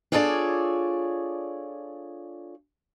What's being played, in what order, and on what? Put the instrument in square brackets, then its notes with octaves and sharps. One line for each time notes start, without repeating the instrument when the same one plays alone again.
[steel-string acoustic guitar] D4 F4 G#4 A4 C#5 D5